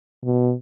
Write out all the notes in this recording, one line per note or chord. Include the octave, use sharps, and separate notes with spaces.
B2